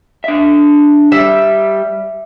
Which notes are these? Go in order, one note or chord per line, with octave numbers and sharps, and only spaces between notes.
D4 E5
G3 E5